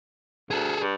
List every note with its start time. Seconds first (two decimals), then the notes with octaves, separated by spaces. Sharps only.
0.51 D2 G#4 A4
0.80 G2